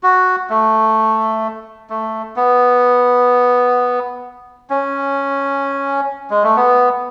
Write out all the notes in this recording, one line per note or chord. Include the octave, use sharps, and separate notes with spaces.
F#4
A3
A3
B3
C#4
G#3
A3
B3